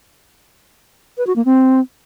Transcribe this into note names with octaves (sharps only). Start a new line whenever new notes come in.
B4
F#4
A#3
C4